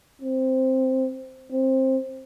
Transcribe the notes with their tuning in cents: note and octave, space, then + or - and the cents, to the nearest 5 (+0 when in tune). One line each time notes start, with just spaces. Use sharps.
C4 +0
C4 +15